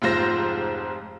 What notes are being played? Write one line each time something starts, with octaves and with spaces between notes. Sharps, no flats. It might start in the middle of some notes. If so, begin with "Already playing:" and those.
F1 G#2 F4 C5 A#6